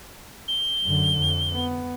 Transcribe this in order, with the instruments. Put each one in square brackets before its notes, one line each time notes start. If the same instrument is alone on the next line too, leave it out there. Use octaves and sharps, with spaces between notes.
[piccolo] G7
[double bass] F#2 D3
F2
B3